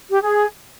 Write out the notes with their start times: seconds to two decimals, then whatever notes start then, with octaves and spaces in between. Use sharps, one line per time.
0.10 G4
0.21 G#4